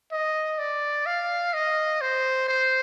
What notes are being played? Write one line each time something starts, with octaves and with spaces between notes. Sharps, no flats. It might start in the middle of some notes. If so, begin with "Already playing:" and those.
D#5
D5
F5
D#5
C5
C5